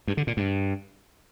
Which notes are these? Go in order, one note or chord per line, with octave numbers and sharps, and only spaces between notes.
G2
D3
A#2
G2